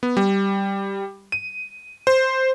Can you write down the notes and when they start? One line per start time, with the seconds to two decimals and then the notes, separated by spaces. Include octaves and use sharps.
0.03 B3
0.17 G3
1.32 D#7
2.07 C5